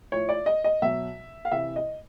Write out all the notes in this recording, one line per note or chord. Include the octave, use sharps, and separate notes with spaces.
A2 F3 C#5
D5
D#5
D#5
B2 F#3 E5
F5
C3 E3 E5
D#5